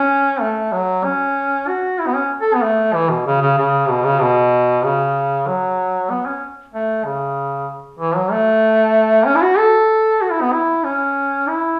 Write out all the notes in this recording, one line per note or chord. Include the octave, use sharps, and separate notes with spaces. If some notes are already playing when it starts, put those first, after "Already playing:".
Already playing: C#4
A3
F#3
C#4
F#4
E4
B3
C#4
A4
B3
A3
E3
B2
C#3
C#3
C#3
B2
C#3
B2
C#3
F#3
B3
C#4
A3
C#3
E3
F#3
A3
C#4
E4
F#4
A4
F#4
E4
B3
E4
C#4
E4